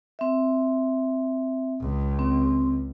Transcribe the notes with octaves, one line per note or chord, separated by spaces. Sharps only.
C4 E5
C#2
C4